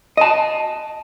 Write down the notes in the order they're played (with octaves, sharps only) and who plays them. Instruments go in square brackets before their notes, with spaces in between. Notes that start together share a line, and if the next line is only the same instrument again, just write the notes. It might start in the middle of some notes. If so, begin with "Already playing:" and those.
[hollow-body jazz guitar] D#5 A5